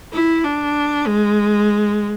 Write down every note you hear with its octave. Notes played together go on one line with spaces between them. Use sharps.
E4
D4
G#3